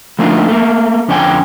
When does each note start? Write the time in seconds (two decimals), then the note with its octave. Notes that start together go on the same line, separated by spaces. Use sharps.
0.19 F3 A3 A#3 D4 D#4 F4
0.48 A3 A#3
1.08 F2 D3 C#4 D5 G5 G#5